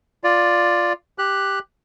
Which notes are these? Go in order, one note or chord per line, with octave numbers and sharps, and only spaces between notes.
F4 D5
G4 F#6